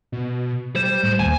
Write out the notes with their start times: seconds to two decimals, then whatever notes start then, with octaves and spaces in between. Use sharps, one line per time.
0.12 B2
0.76 G3 C5
1.03 A2
1.19 D#2 G#5